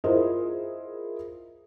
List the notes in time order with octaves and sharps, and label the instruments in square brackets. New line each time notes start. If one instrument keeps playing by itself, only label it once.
[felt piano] E4 F4 G#4 A#4 C5 D#5